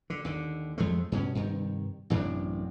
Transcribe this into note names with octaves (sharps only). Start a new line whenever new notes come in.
D3
D#2 D3
F2 F3 G#3 A3
G2 B2 C#4
G2 C3 D#3
A1 F#2 C3 D4